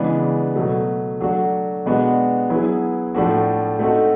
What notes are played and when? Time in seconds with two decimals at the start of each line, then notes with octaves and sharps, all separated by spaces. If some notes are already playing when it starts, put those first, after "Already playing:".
Already playing: C#3 E3 G#3 B3 D4
0.56 B2 F#3 A3
1.20 F#3 A3 D4 F#4
1.86 B2 G#3 B3 D4 F#4
2.49 F#3 B3 E4 G#4
3.15 A2 F3 A3 D4 F#4
3.79 A3 C4 D#4 F#4 A4